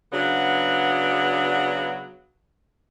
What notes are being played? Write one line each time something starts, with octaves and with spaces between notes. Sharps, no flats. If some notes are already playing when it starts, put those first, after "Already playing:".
C#3 F#3 B3 D4